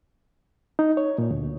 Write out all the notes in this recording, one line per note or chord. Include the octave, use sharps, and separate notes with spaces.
D#4
C#5
A#2
D2